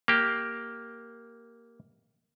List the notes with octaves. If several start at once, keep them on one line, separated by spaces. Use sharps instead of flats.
A#3 G4